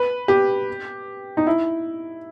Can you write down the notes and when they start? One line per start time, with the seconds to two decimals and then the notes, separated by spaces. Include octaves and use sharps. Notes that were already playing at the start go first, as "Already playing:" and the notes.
Already playing: B4
0.28 G4
1.37 D#4
1.47 E4